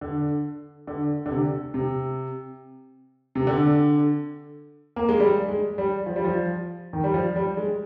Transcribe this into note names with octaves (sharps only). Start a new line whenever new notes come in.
D3
D3
D3
C3
C3
C3
D3
A#3
G#3
G3
G#3
G3
F3
G3
F3
D#3
G3
F3
G3
G#3